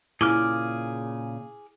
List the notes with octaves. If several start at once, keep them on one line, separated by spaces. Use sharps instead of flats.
A#2 C#3 E4 G#4 G#5 D6 F6